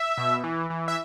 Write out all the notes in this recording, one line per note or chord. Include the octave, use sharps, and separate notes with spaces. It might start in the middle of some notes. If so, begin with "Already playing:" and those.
Already playing: E5
B2
E3
E3
E5